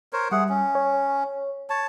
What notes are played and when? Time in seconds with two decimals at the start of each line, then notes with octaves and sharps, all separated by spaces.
0.13 A#4 C5 C#5
0.32 G3 G#4 E5 F#5
0.49 C#4
0.75 C#5
1.70 C#5 A5